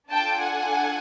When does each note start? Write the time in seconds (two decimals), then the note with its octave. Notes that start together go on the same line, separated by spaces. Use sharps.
0.12 D4 F4 A4 G5 A5
0.40 F#5 G#5